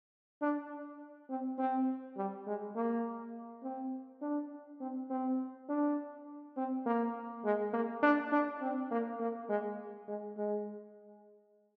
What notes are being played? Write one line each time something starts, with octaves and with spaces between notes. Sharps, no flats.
D4
C4
C4
G3
G#3
A#3
C4
D4
C4
C4
D4
C4
A#3
G#3
A#3
D4
D4
C4
A#3
A#3
G#3
G#3
G#3